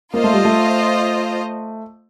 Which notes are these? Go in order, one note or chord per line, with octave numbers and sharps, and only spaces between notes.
A#3 F4 C5 D#5
A3
G3
A3